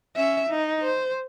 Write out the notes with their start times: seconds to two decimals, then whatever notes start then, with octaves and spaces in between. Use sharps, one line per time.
0.16 C#4 E5
0.49 D#4
0.82 C5